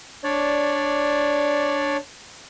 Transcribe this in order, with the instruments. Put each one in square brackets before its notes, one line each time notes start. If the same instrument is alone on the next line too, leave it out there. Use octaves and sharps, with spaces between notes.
[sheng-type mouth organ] D4 C#5 D5